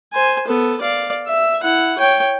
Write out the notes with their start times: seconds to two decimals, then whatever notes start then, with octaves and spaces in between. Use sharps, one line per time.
0.13 C5 G#5
0.47 B3 A4
0.82 D5 F5
1.27 E5
1.62 E4 F#5
1.98 C#5 G5